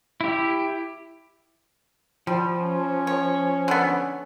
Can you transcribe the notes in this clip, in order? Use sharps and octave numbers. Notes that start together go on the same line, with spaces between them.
E4 G4
F3 G3
C#4
C#5
D3 B3